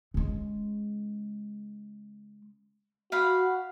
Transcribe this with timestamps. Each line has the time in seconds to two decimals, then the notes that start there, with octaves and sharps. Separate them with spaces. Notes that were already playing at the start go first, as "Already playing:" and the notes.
0.14 C#3 G#3
3.12 F#4 F5 F#5 B5